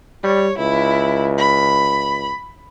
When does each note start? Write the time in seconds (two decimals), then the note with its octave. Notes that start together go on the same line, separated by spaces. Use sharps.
0.24 G3 C#5
0.58 C#2 E4
1.38 B5